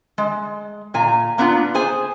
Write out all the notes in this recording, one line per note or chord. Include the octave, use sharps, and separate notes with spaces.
G#3
A#2 G#5 A#5
A#3 B3 D4 D#4 F4
G#4 C5 G#5